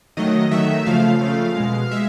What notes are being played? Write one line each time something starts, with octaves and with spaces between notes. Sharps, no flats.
D#3 F#3 A3 D#5
D#3 F#3 A3 E5
C#3 F3 A3 F5
C#3 F3 A3
B2 G#3
G#3 E5